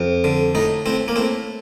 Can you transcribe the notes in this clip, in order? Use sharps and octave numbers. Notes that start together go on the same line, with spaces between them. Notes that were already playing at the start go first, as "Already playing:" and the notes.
Already playing: F2
D3
A2 D#4
A2 C4
A#3
A2 C4